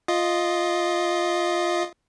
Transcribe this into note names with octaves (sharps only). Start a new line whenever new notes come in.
F4 D#5